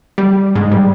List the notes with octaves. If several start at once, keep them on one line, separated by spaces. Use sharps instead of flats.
G3
G#2
G3